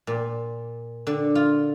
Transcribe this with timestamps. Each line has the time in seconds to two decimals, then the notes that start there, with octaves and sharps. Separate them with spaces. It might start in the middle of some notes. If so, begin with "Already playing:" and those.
0.07 A#2
1.07 D3
1.35 F4